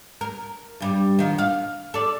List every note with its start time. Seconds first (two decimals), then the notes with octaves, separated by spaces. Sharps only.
0.21 A#4
0.80 G2 G3
1.19 D#3 F3
1.38 F5
1.94 A4 D5